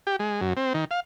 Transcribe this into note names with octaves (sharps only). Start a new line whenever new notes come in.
G4
G#3
F#2
C4
D#3
F5